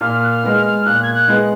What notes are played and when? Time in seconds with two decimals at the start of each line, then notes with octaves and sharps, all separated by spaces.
0.01 A#2 F6
0.23 F#6
0.29 F6
0.43 G#3 B3
0.57 F6
0.85 A#2 F#6
1.03 G#6
1.14 F#6
1.28 G#3 B3